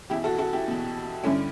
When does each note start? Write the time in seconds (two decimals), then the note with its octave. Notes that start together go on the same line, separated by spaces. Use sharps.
0.10 E2 B2 E4 G4
0.24 F#4 A4
0.38 F#4 A4
0.53 E4 G4
0.68 E2 B2
1.24 G2 D3 C#4 E4